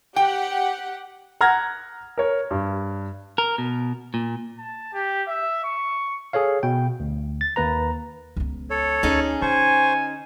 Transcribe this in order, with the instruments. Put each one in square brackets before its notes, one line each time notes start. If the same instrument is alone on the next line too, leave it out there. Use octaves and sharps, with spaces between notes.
[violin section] G4 F#5 [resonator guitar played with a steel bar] G5
[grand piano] F#5 A#5 F6 G#6 A#6
A#4 C#5
G2
[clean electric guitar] A#4
B2
A#2
[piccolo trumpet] A5
G4
E5
C#6
[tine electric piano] G#4 A4 C#5 F5
B2 G5
D2
A6
D#2 A#3 B4 A#5
[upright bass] C#2 B3
[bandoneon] A4 C#5
[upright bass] D2 [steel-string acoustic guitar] C#4 D#4 G#4
[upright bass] D3 [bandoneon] C5 C#6 [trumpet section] G#5